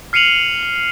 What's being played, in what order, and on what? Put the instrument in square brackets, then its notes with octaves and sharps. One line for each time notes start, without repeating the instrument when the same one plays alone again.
[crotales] F6 C7 C#7 D#7 F7 F#7